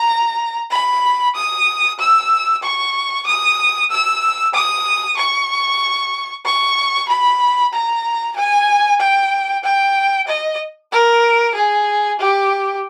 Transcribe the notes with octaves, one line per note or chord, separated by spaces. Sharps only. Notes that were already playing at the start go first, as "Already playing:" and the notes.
Already playing: A#5
B5
D#6
E6
C#6
D#6
E6
D#6
C#6
C#6
B5
A#5
G#5
G5
G5
D#5
A#4
G#4
G4